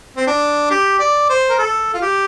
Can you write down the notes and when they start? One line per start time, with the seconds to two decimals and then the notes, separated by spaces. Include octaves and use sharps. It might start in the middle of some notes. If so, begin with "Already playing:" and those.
0.17 C4
0.27 D4
0.71 G4
0.99 D5
1.30 C5
1.50 A#4
1.59 A4
1.94 F4
2.02 G4